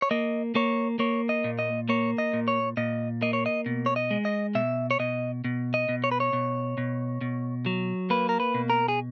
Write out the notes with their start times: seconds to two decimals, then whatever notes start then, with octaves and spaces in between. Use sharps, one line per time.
0.02 C#5
0.11 A#3 D#5
0.55 A#3 C#5
0.99 A#3 C#5
1.29 D#5
1.44 A#2
1.59 D#5
1.89 A#3 C#5
2.18 D#5
2.33 A#2
2.48 C#5
2.77 A#2 D#5
3.22 A#3 D#5
3.33 C#5
3.46 D#5
3.66 B2
3.86 C#5
3.96 D#5
4.11 G#3
4.25 D#5
4.55 B2 E5
4.91 C#5
4.99 B2 D#5
5.44 B2
5.74 D#5
5.89 B2
6.04 C#5
6.11 B4
6.20 C#5
6.33 B2
6.78 B2
7.21 B2
7.66 F#3
8.10 A#3 B4
8.29 A#4
8.40 B4
8.54 B2
8.70 A#4
8.88 G#4